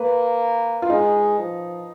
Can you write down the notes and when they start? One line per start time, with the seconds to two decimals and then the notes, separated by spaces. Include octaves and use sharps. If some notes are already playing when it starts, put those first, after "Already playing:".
Already playing: A#3 B4
0.82 F4
0.90 G#3 D#4
1.39 F3